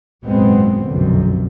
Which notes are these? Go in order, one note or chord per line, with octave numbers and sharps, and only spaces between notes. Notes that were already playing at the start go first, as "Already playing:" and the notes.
G#1 F#2 A#2 G#3 B3 C4
F1 B1 F#2 D3